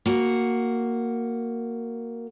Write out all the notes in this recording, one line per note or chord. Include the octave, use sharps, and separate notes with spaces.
A#3 F#4